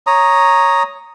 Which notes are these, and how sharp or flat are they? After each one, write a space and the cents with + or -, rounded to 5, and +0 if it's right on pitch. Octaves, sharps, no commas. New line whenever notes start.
C#5 +0 A#5 +0 D#6 +0